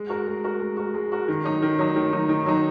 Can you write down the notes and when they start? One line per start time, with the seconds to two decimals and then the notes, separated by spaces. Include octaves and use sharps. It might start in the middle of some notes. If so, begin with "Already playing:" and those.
Already playing: G#3
0.09 F#4 A#4
0.27 G#3
0.44 F#4 A#4
0.60 G#3
0.77 F#4 A#4
0.94 G#3
1.12 F#4 A#4
1.28 D#3
1.45 F#3 D#4
1.62 D#3
1.79 F#3 D#4
1.96 D#3
2.13 F#3 D#4
2.29 D#3
2.46 F#3 D#4